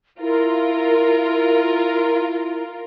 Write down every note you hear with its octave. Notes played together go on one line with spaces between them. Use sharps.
E4 F4 A#4